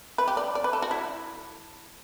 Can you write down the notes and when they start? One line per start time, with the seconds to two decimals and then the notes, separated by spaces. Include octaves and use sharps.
0.18 B4
0.28 G4
0.37 D5
0.55 D5
0.64 B4
0.73 A4
0.82 F#4
0.91 E4